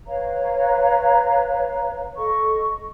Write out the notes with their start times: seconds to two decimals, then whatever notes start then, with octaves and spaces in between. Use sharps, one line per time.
0.07 B4 C#5 F5 A#5
2.17 A4 D#5 C#6